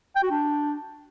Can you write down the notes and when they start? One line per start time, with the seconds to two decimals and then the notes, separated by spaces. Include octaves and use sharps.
0.16 G5
0.23 F#4
0.31 D4